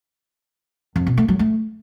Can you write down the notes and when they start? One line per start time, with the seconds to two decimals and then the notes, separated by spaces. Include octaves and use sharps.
0.96 F2
1.07 B2
1.17 A3
1.28 F#3
1.39 A3